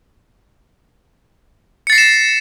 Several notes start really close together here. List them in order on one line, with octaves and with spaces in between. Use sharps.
C#7 A6 C7 A#6 E7